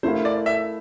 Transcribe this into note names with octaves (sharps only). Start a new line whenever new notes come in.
A3 E4 A#4 C5 F5
D5
E5